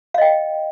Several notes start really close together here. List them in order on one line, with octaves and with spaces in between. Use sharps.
F5 D#5 G5